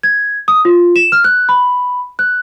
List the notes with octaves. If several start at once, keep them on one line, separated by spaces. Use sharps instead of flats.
G#6
D#6
F4
E7
F6
F#6
B5
F#6